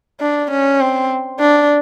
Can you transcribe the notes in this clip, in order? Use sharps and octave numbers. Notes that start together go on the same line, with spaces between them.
D4
C#4
C4
D4